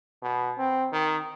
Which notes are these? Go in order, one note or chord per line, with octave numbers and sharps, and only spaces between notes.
B2
C4
D#3